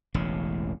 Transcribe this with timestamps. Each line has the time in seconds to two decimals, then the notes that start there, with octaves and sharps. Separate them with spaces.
0.14 E1 A1 C#3